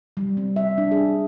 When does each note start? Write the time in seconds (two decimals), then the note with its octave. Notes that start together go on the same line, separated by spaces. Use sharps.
0.17 G3
0.37 C4
0.56 E5
0.78 D4
0.91 G#4